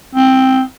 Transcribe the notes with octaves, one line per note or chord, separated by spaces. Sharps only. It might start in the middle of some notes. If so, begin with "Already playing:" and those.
C4